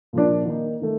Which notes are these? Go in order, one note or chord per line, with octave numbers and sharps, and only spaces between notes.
A#2 F3 A#3 D4
D#3 A#3 D#4
D#3 A3